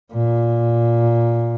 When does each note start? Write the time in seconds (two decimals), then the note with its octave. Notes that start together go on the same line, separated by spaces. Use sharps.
0.13 A#2